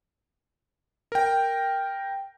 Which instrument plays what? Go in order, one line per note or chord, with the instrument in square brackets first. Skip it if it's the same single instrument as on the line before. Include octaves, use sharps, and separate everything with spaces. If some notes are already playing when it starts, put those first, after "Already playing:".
[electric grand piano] A#4 G5